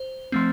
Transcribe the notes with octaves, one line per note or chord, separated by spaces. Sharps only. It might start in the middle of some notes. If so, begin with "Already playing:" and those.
Already playing: C5
F3 A3 C4